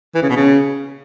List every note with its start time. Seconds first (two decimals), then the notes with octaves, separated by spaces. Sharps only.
0.15 E3
0.22 C#3
0.29 B2
0.37 C#3